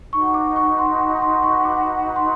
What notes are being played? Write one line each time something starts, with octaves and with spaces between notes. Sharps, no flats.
D#4 F#4 B4 C#6
D6
C#6
C6
C6
C#6
D6
C6